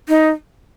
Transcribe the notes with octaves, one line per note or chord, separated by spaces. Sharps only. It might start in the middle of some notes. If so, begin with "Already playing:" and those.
D#4